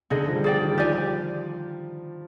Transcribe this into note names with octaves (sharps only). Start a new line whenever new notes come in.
D3 D#4 G#4 D#5
F3
G3
G#4 D5 G5
D#3
G3
F3 G4 D5 G#5